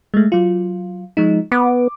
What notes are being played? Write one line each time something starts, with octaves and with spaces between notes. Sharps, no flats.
G#3 A3
F#3 F4
F3 G#3 D#4
B3 D6